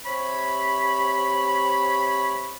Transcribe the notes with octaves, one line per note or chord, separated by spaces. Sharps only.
C3 C#5 B5